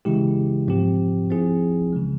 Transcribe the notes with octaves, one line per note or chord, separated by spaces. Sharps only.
C#3 E3 G#3 E4 G4
G#2 F3 C4 G4
F3 C4 E4 G#4
C#3 E3 G#3